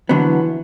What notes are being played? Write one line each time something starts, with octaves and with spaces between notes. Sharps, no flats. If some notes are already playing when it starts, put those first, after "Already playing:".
D3 E3 F#3 B3